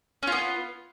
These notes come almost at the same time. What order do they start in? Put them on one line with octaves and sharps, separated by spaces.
C#4 F4 B3